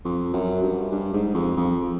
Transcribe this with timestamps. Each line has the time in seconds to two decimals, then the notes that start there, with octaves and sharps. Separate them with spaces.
0.05 F2
0.34 F#2
0.63 G2
0.92 G2
1.13 G#2
1.35 F2
1.57 F2